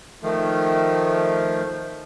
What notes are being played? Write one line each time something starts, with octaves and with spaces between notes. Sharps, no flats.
D#3 F3 A3